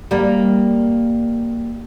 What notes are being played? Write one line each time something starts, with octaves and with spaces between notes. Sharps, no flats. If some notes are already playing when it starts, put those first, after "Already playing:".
G3 A#3